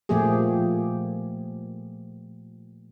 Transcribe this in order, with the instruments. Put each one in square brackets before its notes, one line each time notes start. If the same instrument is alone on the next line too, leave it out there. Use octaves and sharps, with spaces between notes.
[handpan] A#2 F3 A3 A#3 G4 G#4